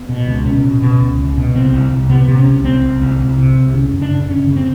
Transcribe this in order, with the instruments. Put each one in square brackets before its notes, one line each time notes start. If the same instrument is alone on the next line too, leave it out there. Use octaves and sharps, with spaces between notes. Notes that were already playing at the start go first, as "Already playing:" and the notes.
Already playing: [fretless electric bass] B3
B2
C#2
B2 C#4
B2
B2
C#2
C#2
B2
C2 C4
C2
C2
C3 B3
C3
C#4
C2
C2 C4
C2
C2
C2
C3
C2
C#3 C#4
F#2
D4
C#3
F#2 C#4
C#3
C4